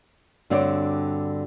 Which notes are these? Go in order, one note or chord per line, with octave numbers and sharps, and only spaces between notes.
G2 D3 C4 F#4 C#5 D5